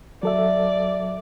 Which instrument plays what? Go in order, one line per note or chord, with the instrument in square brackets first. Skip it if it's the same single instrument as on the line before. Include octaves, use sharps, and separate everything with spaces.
[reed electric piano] F#3 A4 E5 [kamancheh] D5